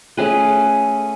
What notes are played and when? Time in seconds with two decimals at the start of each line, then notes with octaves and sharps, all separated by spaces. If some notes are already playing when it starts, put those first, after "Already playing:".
0.17 A3 C#4 G#4 B4